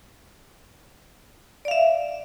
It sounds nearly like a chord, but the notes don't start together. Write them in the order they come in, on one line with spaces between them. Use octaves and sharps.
D5 F5 E5